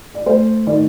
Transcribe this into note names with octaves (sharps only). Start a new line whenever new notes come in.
D5
A3 C5
D#3 D5